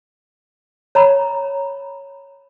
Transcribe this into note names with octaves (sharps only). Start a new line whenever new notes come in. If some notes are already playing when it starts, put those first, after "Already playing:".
C#5 A#5 B5